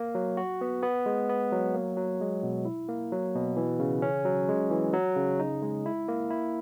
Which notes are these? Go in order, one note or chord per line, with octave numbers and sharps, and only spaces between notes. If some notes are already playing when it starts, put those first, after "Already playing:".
Already playing: A#3
F#3
F#4
B3
B3
G#3
B3
F#3
A#3
F#3
G#3
B2
E4
A#3
F#3
B2
E3
C#3
C#4
F#3
G#3
E3
F#3
C#3
D#4
G#3
E4
A#3
E4